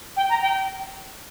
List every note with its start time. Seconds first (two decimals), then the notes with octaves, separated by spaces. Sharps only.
0.16 G5
0.29 A#5
0.41 G5